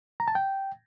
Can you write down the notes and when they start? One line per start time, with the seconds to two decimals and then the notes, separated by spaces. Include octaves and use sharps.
0.20 A#5
0.28 A5
0.35 G5